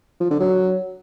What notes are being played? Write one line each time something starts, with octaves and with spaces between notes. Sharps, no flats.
F3
D3
F#3